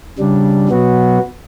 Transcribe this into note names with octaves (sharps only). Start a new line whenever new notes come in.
C#3 G3 D4
B2 F#3 B3 F#4